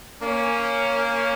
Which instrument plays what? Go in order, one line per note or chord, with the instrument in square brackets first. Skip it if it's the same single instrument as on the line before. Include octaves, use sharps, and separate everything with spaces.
[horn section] A#3 C#4